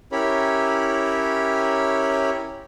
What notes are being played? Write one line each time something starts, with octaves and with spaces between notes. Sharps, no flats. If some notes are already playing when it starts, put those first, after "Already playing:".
C#4 E4 G4 A#4 C#5 B5